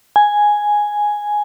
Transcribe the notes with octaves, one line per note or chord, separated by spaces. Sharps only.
G#5